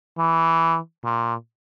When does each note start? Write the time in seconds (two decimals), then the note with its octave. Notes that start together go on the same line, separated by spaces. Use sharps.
0.18 E3
1.04 A#2